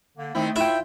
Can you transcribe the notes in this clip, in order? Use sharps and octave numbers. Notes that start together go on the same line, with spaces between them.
D3 A#3
D#3 A3 C4 E4
E4 F4 E5 G5